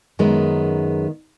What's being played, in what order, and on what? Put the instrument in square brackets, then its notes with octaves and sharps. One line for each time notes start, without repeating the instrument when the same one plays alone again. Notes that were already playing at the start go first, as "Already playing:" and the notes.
[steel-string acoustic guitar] F#2 D#3 G#3 B3